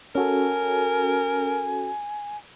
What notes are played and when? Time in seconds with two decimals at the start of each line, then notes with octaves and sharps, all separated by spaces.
0.15 C#4 F#4 A4 A#4 G#5